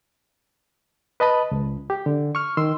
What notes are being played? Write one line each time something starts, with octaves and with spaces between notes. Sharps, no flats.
B4 D#5 A5 B5
C#2
G4
D3
C#6 F6
D#3 C6 E6